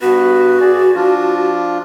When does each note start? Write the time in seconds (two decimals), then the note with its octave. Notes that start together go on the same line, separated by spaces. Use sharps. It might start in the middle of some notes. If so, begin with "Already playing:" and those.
0.01 G2 B3 F#4 B4
0.60 G#4 D5
0.95 F3 D4 F4